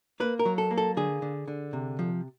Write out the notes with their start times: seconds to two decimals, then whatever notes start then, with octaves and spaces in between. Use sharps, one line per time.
0.20 A#3 B4
0.39 A#4
0.45 F#3
0.58 A4
0.71 A#3
0.78 A4
0.97 D3 G#4
1.22 D3
1.48 D3
1.73 C3
1.99 F3